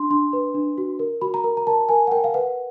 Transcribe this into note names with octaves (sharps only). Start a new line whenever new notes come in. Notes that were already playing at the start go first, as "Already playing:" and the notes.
Already playing: D4 C6
D4 C6
B4
D4
F#4
A#4
F#4 B5
A#5
A#4
A#5
A#4 A5
A#4 G#5
F#5
A#4 G5
F5
B4 F#5